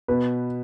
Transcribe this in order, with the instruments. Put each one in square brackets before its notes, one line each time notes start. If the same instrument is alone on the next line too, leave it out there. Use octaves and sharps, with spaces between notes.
[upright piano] B2 [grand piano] B4